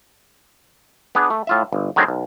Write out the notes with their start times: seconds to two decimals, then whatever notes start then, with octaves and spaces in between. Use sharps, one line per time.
1.15 B3 D4 G#4
1.30 A3
1.47 A2 F4 E5
1.73 G1
1.96 D3 D#3 F#3 G#3 C4
2.08 B1